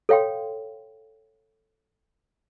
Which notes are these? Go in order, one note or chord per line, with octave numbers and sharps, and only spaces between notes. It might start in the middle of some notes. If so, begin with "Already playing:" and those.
A4 C#5 F5 G5 C6